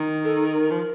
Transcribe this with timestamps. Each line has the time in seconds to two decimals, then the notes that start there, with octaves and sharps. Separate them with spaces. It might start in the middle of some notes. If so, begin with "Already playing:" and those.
Already playing: D#3
0.24 A4
0.53 A#4
0.71 F3